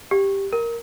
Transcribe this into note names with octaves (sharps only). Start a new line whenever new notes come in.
G4
A#4